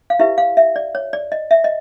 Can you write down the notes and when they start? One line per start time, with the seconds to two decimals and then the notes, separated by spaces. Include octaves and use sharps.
0.10 F5
0.19 E4 G4 B4 E5
0.38 F5
0.57 E5
0.76 D5
0.95 C#5
1.13 D5
1.32 D#5
1.51 E5
1.64 D#5